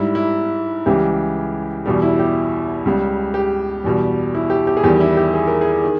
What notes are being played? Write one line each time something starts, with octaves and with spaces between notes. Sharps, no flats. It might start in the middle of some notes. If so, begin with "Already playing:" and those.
Already playing: G#2 G3 E4
E4
C#2 C#3 E3 G3 G4
E2 B2 G3 G4
E4
G4
C#2 C#3 G3
G4
E2 B2 G3
E4
G4
G4
G#4
E2 D#3 G3 G4
E4
G4
G#4
A#4
G#4
D#3